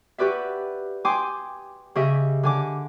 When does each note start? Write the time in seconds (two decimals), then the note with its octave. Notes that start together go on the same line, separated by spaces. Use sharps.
0.18 F#4 G4 B4 D5 E5
1.05 G5 G#5 C6 D6 D#6
1.95 C#3 G4 D#5 E5
2.43 D3 G#5 D6